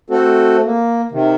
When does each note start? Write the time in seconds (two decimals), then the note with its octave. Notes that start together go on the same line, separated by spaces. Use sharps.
0.10 A3 C4 F#4 A4
0.64 A#3
1.12 C3 D#3